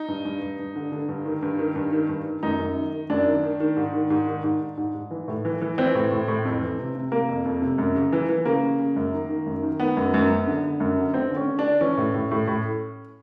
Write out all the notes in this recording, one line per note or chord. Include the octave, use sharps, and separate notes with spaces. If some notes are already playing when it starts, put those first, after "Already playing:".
Already playing: D#4
G2
G2
G2
G2
D3
D3
G2
D#3
G2
D#3
G2
D#3
G2
D#3
F#2 D#4
F#2
D#3
D#3
F#2 D4
D#3
D#3
D#3
G#2
D#3
G#2
D#3
G#2
G#2
G#2
G#2
E3
A2
E3
E3
E3 C4
A2
A2
A2
F2
E3
C3
C3
C3 A#3
F2
F2
C3
F#2
C#3
E3
E3
C#3 A#3
C#3
C#3
F#2
D#3
D#3
F#2
D#3
D#3 B3
F#2
F#2
F#2
D3
D3
F#2
D3
D3 C4
D3
C#4
D3
D4
D3
E3 C#4
A2
A2
A2
A2